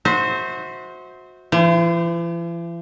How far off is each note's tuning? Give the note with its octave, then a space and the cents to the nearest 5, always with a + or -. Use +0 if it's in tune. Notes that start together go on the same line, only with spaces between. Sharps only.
F#4 -20 C5 +0 E5 -40
E3 +45 C5 -15